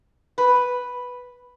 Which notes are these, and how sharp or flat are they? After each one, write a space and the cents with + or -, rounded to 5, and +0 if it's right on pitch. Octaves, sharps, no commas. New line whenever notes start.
B4 +0